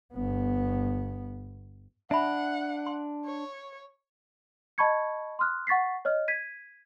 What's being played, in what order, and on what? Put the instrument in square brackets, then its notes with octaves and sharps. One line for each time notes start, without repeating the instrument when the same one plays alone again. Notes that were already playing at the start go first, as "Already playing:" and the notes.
[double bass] G1 B3
[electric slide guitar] D4 [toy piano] E5 B5 [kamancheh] F#5
[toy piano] C6
[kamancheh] C#5
[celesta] D#5 A5 B5 C#6 G#6 C#7
C6 D#6 F6 F#6
F#5 C#6 A6 B6 C7
C#5 D#5 F6
G#6 B6 D#7